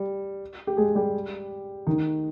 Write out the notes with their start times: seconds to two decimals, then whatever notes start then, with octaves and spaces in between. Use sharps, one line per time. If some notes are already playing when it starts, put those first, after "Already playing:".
Already playing: G3
0.67 G4
0.77 G#3 G#4
0.95 G3 G4
1.87 D#3 D#4